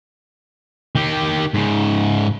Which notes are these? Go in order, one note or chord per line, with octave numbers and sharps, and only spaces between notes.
D#3 G4
G#2 C#3